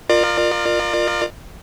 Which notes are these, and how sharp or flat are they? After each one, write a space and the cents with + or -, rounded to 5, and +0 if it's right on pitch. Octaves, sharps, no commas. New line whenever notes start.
F4 +5 A#4 +0 D5 +40